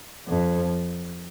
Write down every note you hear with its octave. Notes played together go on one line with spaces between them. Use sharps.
F2